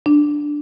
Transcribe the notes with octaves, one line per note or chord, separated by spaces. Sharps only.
D4